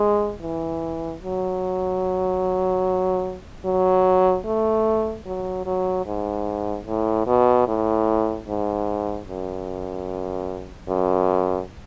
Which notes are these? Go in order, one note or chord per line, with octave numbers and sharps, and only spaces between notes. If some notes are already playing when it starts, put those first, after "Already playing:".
Already playing: G#3
E3
F#3
F#3
A3
F#3
F#3
G#2
A2
B2
A2
G#2
F#2
F#2